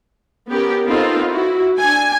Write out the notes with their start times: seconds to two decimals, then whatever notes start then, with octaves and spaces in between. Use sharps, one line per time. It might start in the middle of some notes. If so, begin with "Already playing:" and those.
0.50 B3 C#4 G4 A#4
0.85 B3 C4 D#4 F4 A4 A#4
1.29 E4 F#4
1.79 D4 G#5